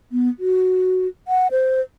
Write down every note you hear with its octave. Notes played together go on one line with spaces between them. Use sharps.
B3
F#4
F#5
C5